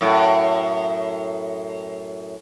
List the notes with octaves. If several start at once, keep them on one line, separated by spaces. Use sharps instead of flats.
F#2 A2